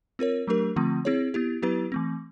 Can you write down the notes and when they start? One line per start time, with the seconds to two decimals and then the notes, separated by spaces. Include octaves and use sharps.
0.19 C4 F4 A#4 C#5
0.47 F#3 A3 D4 G4 A#4
0.76 D3 F3 A3 C4 F4
1.05 C4 E4 G#4 C#5
1.34 B3 E4 G4
1.62 F#3 B3 E4 G4 B4
1.92 E3 A3 C4